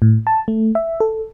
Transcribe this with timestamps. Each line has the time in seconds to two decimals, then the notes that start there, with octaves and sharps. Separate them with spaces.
0.02 A2
0.27 A5
0.48 A3
0.75 E5
1.00 A4